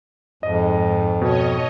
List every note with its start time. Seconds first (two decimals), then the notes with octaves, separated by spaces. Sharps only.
0.43 F2 G#2 D#5
1.22 B2 C#5 D#5